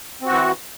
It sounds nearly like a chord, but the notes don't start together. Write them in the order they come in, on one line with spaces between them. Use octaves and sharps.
C4 F#4 E3